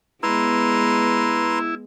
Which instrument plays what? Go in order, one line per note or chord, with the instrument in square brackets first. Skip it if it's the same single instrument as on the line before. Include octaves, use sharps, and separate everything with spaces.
[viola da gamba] G#3 B3 [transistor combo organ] E4 [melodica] B4 A#5 C6